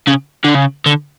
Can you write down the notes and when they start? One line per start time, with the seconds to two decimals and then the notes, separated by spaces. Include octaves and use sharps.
0.08 C#3
0.45 D3
0.55 C#3
0.86 D3